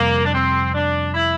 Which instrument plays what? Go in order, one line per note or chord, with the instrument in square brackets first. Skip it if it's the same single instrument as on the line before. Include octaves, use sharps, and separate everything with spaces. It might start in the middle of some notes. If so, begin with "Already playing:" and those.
Already playing: [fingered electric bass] F2 C3 G3 [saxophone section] A#3
[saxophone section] D4
C4
D4
E4